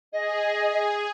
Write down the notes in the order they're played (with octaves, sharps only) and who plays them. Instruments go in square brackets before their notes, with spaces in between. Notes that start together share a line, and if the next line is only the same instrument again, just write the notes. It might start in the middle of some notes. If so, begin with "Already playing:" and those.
[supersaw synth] G#4 [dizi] D#5